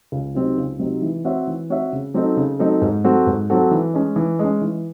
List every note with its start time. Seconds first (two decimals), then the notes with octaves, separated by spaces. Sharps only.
0.12 C#2
0.35 C3 F#3 C4 D#4
0.58 C#2
0.79 C3 F#3 C4 D#4
1.02 E3
1.24 C4 F#4 C#5 E5
1.47 E3
1.70 C4 F#4 C#5 E5
1.92 C#3
2.14 F#3 C4 D#4 A4
2.37 C#3
2.59 F#3 C4 D#4 A4
2.82 G#2
3.04 F#3 C4 F#4 A4
3.26 G#2
3.50 F#3 C4 F#4 A4
3.71 E3
3.94 G#3 C#4
4.16 E3
4.39 G#3 C#4
4.61 E3